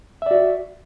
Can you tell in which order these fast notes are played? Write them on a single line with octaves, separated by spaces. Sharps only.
E5 D5 F#4